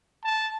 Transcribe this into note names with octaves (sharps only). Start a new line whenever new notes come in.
A5